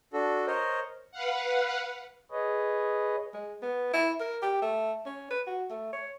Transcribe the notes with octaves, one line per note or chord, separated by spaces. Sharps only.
D4 F#4 A4
A#4 C5 C#5 D#5
B4 F5 F#5
G#4 B4 C#5 D#5
G#3
B3
E4
A#4
G4
A3
C#4
B4
F#4
A3
C#5